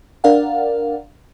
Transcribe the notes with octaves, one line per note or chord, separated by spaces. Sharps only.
D4 A#4 D5 F5 F#5